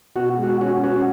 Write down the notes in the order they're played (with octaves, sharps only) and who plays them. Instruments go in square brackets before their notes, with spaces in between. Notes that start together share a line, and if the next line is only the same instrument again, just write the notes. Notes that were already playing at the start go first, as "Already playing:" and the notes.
[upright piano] B2 [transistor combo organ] F#4
[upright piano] G#3
[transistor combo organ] F#4
[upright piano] C#4 [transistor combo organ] F#4
[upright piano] C#4 [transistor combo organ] F#4